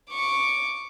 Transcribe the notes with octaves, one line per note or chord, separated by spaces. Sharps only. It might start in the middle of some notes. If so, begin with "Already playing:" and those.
C#6 D6